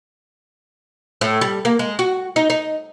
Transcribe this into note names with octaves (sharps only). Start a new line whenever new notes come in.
A2
G3
A#3
G#3
F#4
D#4
D#4